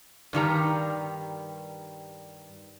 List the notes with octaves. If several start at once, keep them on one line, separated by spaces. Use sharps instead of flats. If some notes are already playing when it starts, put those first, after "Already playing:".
G2 D#3 G3 A#5